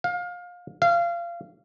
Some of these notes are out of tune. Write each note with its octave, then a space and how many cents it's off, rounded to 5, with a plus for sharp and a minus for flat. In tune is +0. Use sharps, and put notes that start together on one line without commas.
F5 +25
F5 -25